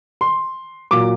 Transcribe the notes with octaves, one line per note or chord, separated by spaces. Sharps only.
C6
A#2 F#3 D6